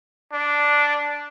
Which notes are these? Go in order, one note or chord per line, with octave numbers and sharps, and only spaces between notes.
D4